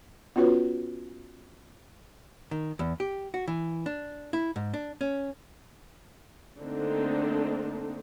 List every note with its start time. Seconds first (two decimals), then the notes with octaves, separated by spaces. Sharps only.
0.36 B3 C#4 F4 F#4 B4 C#5
2.51 D#3
2.79 E2
3.00 G4
3.34 F#4
3.48 E3
3.86 D4
4.33 E4
4.56 G#2
4.74 D4
5.01 C#4
6.59 D3 A3 A#3 C4 D4 D#4